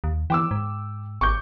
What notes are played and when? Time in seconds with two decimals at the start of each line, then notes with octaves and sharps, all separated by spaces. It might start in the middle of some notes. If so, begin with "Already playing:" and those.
0.04 D#2
0.30 E3 G5 D6 E6
0.51 G#2
1.21 G#1 C#6 D6 G6